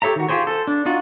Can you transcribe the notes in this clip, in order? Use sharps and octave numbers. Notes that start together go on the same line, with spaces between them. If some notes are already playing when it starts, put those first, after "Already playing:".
G4 A4 C#5 E5 A#5
D#3 F#4
F4 G4 G#4 C5 C#5
A4 C5
D4
D4 D#4 F4 F#4